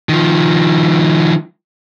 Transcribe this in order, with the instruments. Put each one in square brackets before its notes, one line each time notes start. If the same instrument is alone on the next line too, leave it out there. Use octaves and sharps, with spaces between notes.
[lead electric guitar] D#3 F3